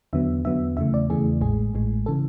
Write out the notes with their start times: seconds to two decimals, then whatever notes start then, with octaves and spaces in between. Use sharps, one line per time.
0.13 E2 D3 F#3 B3 E5
0.45 E2 D3 F#3 B3 E5
0.77 E2 C#3 E3 A3 E5
0.94 D5
1.10 E2 C#3 E3 A3 G#4
1.41 A1 A2 G#3 G#4
1.74 A1 A2 G#3
2.06 C#3 E3 A4